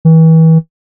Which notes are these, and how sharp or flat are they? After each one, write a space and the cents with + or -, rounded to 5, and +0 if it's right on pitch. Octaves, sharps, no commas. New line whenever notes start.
E3 -35